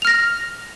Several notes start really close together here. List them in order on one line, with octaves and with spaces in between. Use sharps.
F7 F6 A#6